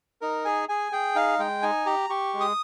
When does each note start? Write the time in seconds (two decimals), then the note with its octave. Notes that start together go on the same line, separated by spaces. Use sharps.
0.21 D#4 A#4
0.45 G#4 G#5
0.69 G#4 G#5
0.92 G#4 G5
1.15 D#4 F5
1.39 G#3 G5
1.62 D#4 G#5
1.86 G4 A#5
2.10 G4 C#6
2.34 G#3
2.40 D#6